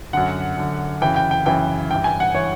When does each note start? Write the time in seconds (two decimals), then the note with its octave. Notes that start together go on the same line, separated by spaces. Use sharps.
0.13 F#2 D3 F#5
0.57 F#2 D3
1.02 F#2 C#3 E3 G5
1.16 G5
1.31 G5
1.46 F#2 C#3 E3 G5
1.90 G2 E3 G5
2.04 G#5
2.20 F#5
2.34 E3 C#5